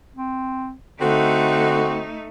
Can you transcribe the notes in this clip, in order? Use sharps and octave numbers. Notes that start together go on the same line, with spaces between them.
C4
D3 A3 C4 D#4 F#4